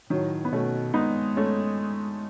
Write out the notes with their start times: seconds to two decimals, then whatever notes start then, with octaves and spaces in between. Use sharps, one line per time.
0.10 A2 D#3 F#3
0.45 B3
0.52 B2 A3 C#4
0.94 G#3 B3 D#4
1.37 A3 C#4